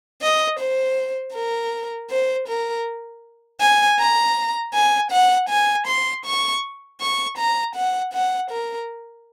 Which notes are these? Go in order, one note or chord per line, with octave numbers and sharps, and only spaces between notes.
D#5
C5
A#4
C5
A#4
G#5
A#5
G#5
F#5
G#5
C6
C#6
C#6
A#5
F#5
F#5
A#4